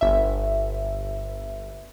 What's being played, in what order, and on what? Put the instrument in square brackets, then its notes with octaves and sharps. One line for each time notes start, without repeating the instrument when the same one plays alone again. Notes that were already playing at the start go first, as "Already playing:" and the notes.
[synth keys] G1 E5